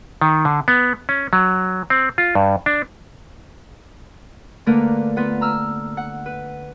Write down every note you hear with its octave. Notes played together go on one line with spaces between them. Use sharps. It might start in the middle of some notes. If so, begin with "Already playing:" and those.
D#3
D3
B3
C#4
F#3
C4
F4
G2
D4
D3 A3 A#3 A#4 B4
B3 F4 B4 F#5
A#5 E6 F6
F#5
B4